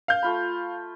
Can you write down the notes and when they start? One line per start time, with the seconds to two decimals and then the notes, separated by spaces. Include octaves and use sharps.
0.08 F5 G6
0.22 A3 F4 B5